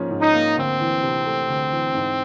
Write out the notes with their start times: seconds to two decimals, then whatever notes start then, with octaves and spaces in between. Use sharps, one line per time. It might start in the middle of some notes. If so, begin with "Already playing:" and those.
Already playing: G#2 F3 A#3 C#4
0.10 G#2
0.21 D#4
0.33 A#3
0.56 D2 C4
0.80 E3
1.03 C3
1.26 A3
1.48 D2
1.71 E3
1.95 G#2